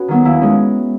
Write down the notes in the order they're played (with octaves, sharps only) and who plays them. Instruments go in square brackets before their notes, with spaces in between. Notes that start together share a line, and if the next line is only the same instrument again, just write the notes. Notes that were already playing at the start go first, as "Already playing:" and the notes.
Already playing: [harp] C#4 F#4 G#4 B4
D#3 F#3 B3
D#2 E4
G#3 C#4